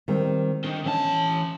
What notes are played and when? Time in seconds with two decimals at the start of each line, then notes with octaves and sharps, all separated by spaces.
0.08 D#3 G3 C4
0.64 D#3 D4
0.86 E3 C#4 A5